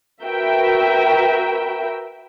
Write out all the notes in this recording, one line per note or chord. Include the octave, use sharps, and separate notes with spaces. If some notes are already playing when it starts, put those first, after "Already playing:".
F#4 A#4 B4 E5 G5